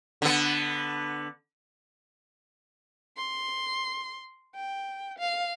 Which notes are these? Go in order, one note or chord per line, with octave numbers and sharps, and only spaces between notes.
D3 B3
C6
G5
F5